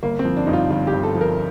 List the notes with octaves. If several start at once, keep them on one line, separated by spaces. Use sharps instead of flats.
G1 A#3
C4
F3
D4
G2 D#4
F4
G1 F4
G4
G1
A4
F3
A#4